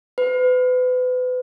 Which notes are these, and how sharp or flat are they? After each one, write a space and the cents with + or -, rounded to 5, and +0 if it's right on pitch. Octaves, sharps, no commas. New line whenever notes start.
B4 +35